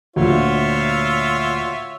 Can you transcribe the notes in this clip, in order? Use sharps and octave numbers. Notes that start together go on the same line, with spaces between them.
D2 A#2 F4 C#5 E5